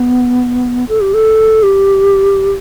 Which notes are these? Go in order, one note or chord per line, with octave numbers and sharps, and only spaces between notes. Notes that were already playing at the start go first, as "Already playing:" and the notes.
Already playing: B3
A4
G4
A4
G4